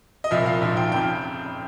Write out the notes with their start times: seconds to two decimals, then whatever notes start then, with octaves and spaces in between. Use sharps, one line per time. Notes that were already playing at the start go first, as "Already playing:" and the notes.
0.24 D#5
0.31 C2 A#2 F3 E5
0.46 F5
0.61 A#1 G#2 F3 E5
0.77 G5
0.92 F1 F2 C#3 G5